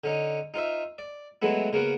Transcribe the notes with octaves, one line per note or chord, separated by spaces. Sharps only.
D3 C#4 D#4
D#4 F4 C5 E5
D5
E3 F#3 G#3 A3 B3 E4
C#3 A#3 B3 F#4